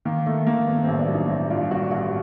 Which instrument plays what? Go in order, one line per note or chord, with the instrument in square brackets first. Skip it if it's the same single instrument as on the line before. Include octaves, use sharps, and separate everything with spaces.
[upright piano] D#3 A#3
D#3 A3
D#3 A#3
G2 B3
A1 C4
D4
F#3
D#4
A1 E4
G2 F4
A1 F#4
A1 F#4